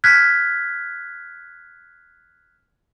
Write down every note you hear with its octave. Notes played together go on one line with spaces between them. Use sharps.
F6 F#6 G#6 B6